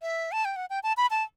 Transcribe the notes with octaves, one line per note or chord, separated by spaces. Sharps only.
E5
A5
G5
F#5
G5
A5
B5
A5